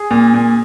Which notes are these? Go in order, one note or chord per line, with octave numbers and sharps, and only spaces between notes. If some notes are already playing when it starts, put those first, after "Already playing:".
Already playing: G#4
A#2
A#2